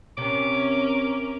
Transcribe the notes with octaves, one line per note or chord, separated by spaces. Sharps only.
C3 C#4 A#4 D6